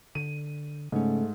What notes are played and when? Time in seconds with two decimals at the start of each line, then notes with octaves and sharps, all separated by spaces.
0.15 D3 D#7
0.92 G#2 C#3 A3 C#4